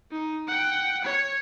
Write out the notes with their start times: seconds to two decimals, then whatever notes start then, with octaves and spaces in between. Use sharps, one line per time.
0.11 D#4
0.47 F#5 G5
1.04 C#5